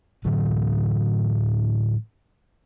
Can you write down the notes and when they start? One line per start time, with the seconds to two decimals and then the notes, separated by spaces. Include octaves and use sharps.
0.25 A2 D3 E3 F#3